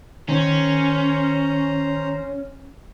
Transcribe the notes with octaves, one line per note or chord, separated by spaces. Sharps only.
D#3 C#4 C5 A#5